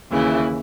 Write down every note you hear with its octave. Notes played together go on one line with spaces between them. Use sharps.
D#2 C#3 E3 E4